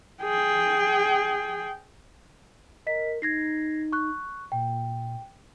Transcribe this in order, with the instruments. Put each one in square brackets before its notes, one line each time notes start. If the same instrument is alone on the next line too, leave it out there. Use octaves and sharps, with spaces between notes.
[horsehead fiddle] G#4 G5
[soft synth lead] A#4 [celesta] D#5 B6
[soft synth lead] D#4 [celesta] G#6 A#6 C7
[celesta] C#6 F#6
[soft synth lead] A#2 [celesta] G5